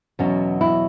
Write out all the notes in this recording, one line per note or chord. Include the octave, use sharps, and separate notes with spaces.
E2 B2 F#3 C#4
E4